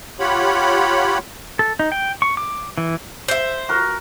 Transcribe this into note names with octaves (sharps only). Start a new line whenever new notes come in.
F4 G4 C#5 F#5 B5
A4
D#4
G5
C#6
D6
E3
C5 E5
F#4 A#4